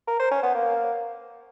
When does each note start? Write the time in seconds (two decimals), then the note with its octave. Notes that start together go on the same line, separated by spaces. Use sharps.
0.08 A#4
0.19 C5
0.31 C#4
0.43 B3
0.55 A#3